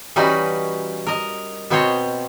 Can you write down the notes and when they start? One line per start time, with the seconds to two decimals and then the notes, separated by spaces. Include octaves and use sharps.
0.16 E3 G3 C#4 D#4 F#4 B4
1.07 A#4 D#5
1.70 B2 B3 C4 F#4 C5 C#5